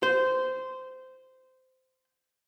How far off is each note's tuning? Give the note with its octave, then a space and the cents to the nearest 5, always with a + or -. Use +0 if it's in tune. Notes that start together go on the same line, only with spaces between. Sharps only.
C5 -15